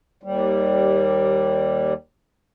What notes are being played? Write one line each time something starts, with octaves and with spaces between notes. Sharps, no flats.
D#2 G3